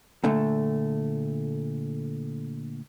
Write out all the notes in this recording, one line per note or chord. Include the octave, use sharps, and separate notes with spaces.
A#2 D3 A3